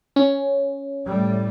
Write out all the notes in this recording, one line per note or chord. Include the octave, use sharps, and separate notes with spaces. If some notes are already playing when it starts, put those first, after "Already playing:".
C#4
A2 G3